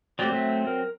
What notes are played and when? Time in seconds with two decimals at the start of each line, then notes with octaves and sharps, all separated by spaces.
0.19 F#3 A3 C4 G4 D5
0.32 A3 E5
0.67 A#4